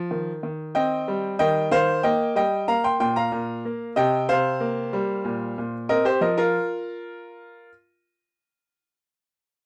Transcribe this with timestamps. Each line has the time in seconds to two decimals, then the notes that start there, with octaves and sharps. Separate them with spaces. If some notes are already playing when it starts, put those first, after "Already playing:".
Already playing: F3
0.11 D#3
0.43 D#3
0.75 C4 D#5 G5
1.08 G3
1.39 D#3 D#5 G5
1.71 D#3 C5 F5
2.03 A#3 D#5 G5
2.35 G3 D#5 G5
2.68 A#3 F5 A#5
2.84 G5 C6
3.00 A#2 G5 C6
3.16 F5 A#5
3.32 A#2
3.65 A#3
3.96 C3 D#5 G5
4.29 C3 C5 F5
4.60 A#3
4.93 G3
5.25 A#2
5.58 A#2
5.89 C4 A#4 D#5
6.05 G4 C5
6.21 F3 A#4 D#5
6.38 F4 A#4